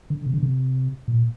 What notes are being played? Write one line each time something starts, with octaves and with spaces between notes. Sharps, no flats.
D3
C3
D3
C3
A#2